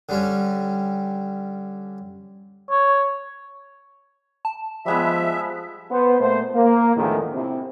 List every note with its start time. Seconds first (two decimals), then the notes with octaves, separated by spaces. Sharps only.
0.09 D3 G3 C#4
2.71 C#5
4.45 A5
4.86 F3 G3 G#3 B3 E5
5.91 B3 C5
6.20 A#2 A3 C5
6.54 A#3
6.96 E2 A2 D3 D#3 F3 G#3
7.33 C3 E4